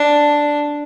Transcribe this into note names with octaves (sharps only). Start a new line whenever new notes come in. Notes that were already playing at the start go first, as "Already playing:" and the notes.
Already playing: D4